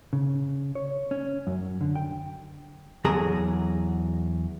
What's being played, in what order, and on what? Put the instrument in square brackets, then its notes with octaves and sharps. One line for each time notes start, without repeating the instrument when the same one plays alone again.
[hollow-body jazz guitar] C#3
C#5
C#4
F#2
D3
G5
E2 F#3 G#4 A5 A#5